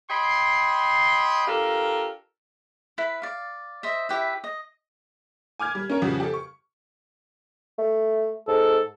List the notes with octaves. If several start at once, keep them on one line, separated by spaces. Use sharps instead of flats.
C#5 D#5 G5 B5 C6
D4 F4 G4 A4 A#4
E4 B4
D5 F5
C5 D#5 E5
E4 G4 B4 E5
D#5
G#5 D6 F6 G#6
G3
C#4 A#4 C#5
F2 C#3 F3 G3 F#4
G4 A4
C#6
A3
G#2 A4